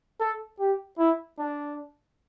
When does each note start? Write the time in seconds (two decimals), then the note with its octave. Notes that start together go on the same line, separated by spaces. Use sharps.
0.20 A4
0.60 G4
0.98 E4
1.39 D4